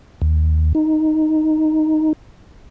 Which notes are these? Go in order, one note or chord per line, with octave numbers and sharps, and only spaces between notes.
D#2
D#4